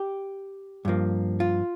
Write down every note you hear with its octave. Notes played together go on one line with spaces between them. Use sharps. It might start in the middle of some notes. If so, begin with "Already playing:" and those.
Already playing: G4
G2 F3 A#3
F4